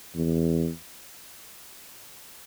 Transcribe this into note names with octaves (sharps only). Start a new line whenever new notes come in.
E2